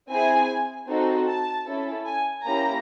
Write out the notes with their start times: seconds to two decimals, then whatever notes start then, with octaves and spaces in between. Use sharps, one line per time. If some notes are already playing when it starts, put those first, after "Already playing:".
0.11 C4 E4 G#4 G#5
0.89 C4 D#4 F#4 A4
1.29 A5
1.67 C#4 E4 A4
2.06 G#5
2.46 A#3 C#4 E4 G4 A#5